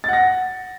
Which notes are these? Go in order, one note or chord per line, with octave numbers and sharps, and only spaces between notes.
F#5 A6 A#6